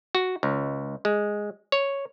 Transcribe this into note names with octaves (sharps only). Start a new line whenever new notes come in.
F#4
C#2
G#3
C#5